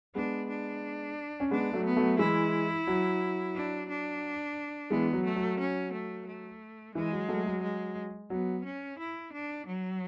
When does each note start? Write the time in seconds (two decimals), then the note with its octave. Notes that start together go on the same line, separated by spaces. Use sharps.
0.15 G#3 B3 D4
0.49 D4
1.40 C#4
1.51 G#3 B3 D4
1.73 F#3 A3
1.86 B3
1.97 F#3 A3
2.19 E3 G#3 E4
2.87 F#3
3.55 D4
3.89 D4
4.90 E3 G#3 B3
5.13 F#3
5.25 A3
5.36 F#3
5.59 C#4
5.93 A3
6.27 A3
6.95 E3 G#3
7.12 F#3
7.28 F#3 A3
7.46 F#3
7.63 G#3
8.30 F#3 B3
8.64 C#4
8.99 E4
9.32 D4
9.66 F#3